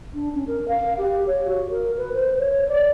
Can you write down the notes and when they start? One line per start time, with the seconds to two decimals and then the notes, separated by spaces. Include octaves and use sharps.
0.14 D4
0.35 C#4
0.48 A#4
0.68 F5
0.98 G4
1.27 C#5
1.46 F#4
1.70 A#4
1.98 B4
2.13 C5
2.39 C#5
2.69 D5